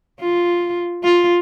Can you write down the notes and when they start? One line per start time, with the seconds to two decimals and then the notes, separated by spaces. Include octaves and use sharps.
0.20 F4
1.04 F4